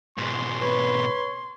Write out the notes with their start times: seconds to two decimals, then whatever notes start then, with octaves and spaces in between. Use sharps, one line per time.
0.17 G#2 B2 C6
0.61 B4 C#5